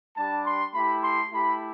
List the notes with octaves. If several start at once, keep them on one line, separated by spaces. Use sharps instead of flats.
G3 D4 G4 A5
C6
A3 E4 G4 B5
C6
A3 E4 G4 B5